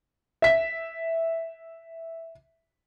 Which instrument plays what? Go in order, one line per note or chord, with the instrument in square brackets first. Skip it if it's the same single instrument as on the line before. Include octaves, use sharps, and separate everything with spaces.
[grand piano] E5 B6